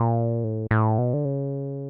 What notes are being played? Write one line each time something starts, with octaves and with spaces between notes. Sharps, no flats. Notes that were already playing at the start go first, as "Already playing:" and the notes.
Already playing: A#2
A2
A2
B2
D3
C#3